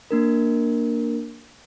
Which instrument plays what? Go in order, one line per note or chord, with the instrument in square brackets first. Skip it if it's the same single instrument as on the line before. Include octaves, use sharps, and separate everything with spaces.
[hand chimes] A#3 D4 A#4